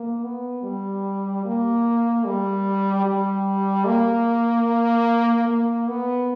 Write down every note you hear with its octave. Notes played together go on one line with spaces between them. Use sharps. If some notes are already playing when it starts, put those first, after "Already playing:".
Already playing: A#3
B3
G3
A#3
G3
G3
A#3
A#3
B3